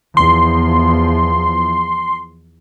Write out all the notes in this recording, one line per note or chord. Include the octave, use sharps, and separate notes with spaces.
E2 F3 C6